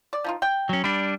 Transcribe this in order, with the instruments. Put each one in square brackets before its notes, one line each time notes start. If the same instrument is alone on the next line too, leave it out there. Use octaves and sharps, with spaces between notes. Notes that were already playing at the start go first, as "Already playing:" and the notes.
[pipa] D5
F3 D#4 F4
G5
[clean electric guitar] F#3 C#4
[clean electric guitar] G3 D4 [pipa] B5